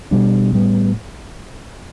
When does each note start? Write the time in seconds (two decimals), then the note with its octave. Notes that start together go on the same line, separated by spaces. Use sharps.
0.11 B2 G3 D4
0.53 A2 G3 B3